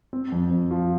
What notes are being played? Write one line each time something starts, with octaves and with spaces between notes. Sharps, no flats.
C4
F2
F2
F3